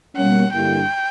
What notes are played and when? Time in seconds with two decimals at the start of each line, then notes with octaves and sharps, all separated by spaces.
0.16 B2 G3 A#3 C#4 F#5
0.51 G2 D3 A#3 E4 G4 G5